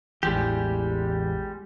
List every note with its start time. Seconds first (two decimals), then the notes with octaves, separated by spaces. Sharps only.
0.23 A1 E2 E3 G3 G#3 G4